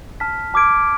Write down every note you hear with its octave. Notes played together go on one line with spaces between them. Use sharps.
A5 F6 B6
A5 D6 F6 G#6 D7